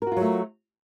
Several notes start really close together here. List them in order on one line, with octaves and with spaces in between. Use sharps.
A#4 F#4 F4 F#3 A3